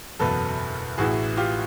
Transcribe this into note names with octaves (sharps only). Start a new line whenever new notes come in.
F#1 E2 B2 A4 B4
A1 A2 E3 F#4 G#4
F4 G4